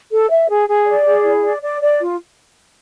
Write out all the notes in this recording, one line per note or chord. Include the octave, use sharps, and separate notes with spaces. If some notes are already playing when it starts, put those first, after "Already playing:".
A4
E5
G#4
G#4
D5
G#4
E4
D5
D5
D5
F4